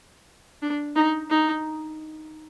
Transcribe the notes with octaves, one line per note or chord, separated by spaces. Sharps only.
D4
D#4
D#4